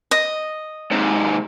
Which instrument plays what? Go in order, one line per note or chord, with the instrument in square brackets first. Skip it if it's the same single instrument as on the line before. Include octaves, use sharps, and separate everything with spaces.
[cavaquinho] D#5
[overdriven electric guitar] G#2 C3